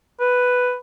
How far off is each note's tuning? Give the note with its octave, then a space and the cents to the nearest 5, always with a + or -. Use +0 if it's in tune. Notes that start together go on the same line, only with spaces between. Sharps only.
B4 +5